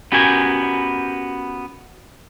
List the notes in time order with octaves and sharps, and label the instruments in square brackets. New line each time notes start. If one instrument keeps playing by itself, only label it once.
[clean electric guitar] B3 C#4 F#4 G4 A#4 G#5